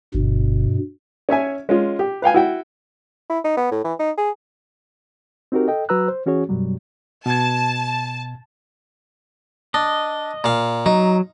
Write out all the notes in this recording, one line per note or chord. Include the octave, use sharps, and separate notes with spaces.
G1 G2 B2
C#4 C#5 E5 G#5
G#3 C#4 F4
G4
B4 F5 G5 G#5
E4 F#4 G5
E4
D#4
B3
A2
E3
D#4
G#4
C4 D#4 F#4 G4 A#4
A4 D#5 G5
F#3 F#4 B4 A#5 E6 F#6
C5
E3 C#4 F#4 G#4 C#5
F#2 B2 F#3 G3
B2 A5 G#6
D4 D#5
A#2 F5
F#3 D#4